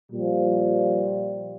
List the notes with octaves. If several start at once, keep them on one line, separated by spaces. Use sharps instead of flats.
A#2 F3 G3